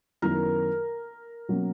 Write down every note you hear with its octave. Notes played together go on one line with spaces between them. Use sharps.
F#2 D#3 F#3 B3 E4 A#4
B2 F#3 A#3 C#4